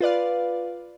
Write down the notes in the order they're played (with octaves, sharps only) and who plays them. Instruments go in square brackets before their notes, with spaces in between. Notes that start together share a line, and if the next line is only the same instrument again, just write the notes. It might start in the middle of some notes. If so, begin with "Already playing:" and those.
[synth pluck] F4 B4 D5 F5